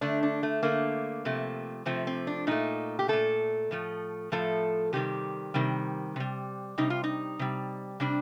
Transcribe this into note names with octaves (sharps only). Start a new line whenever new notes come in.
D3 A3 D4
D4
A3
D3 A3 A#3
C3 F3 A3
C3 F3 A3 C4
C4
D4
A#2 A3 D#4
G4
A#2 A3 A4
A2 F3 A3
A2 F3 A3 A4
C3 D#3 G3 G4
C3 D#3 G3
C3 G3
C3 G3 D#4
F4
D#4
C3 G3
C3 G3 D4